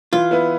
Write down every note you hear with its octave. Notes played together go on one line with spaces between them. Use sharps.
E3 F4
B3 E4 B4